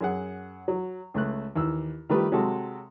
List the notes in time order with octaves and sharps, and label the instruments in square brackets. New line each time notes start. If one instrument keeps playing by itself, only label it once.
[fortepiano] F#2 G#4 F#5
F#3
C#2 A3 F#6
D#2 E3 E6
D#3 F3 G3 A3 G4 B4
C3 F#3 G#3 F#4 A4